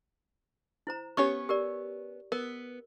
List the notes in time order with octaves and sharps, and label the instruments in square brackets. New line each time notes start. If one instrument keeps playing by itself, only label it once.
[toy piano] E4 C5 A#5
[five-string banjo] B3 C#4 C#5 [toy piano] G4 C#6
[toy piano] G4 A#4 D5
[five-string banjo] B3 [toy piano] A#4